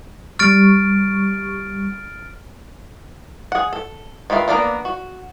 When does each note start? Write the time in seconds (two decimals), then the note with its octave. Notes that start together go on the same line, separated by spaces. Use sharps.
0.39 G3 C#6 F6 A6 D7
3.52 G#4 F#5
3.73 A4
4.30 D#3 F4 B4 E5 F5
4.48 A#3 B3 D4 D#4 A#4
4.85 F#4